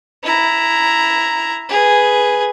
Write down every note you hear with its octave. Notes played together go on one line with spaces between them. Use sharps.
E4 A#5
G#4 B4